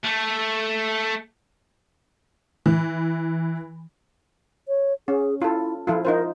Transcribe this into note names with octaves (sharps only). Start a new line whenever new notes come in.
A3
E3
C#5
C#4 G#4
E4 F4 A4
F3 E4 F4 A4
D#4 F4 A#4 C5